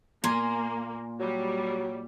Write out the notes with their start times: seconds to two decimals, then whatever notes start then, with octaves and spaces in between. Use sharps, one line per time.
0.24 A#2 A#3 G#5 A#5 C6
1.20 F#3 G3